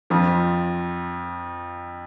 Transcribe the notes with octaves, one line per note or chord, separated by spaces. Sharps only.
F2 F3